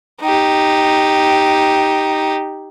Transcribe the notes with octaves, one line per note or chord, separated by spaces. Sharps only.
D#4 G4